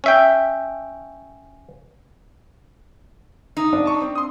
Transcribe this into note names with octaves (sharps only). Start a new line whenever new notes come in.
C#4 E5 G5
D#4
D4
A5 C#6
C4
C6 D#6